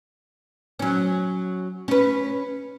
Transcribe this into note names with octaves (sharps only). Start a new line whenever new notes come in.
F#3 C#4
C#4 B4